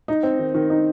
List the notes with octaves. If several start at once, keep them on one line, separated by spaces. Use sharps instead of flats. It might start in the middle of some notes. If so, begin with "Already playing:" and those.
D#4
C4
D#3
D#3
D#4